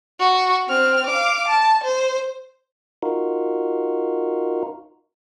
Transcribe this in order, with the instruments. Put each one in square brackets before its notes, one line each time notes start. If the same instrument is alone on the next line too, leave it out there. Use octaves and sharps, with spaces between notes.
[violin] F#4
C4 F6
F5 D6
A5
C5
[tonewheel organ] D#4 F4 F#4 A#4